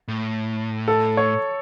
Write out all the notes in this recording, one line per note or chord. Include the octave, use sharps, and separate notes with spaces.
A2
A4
C#5